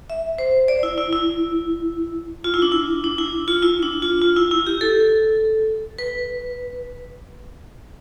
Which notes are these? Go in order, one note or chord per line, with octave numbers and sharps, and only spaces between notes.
E5
C5
D5
E4
E4
E4
F4
E4
D4
E4
D4
E4
F4
E4
D4
F4
F4
E4
E4
G4
A4
B4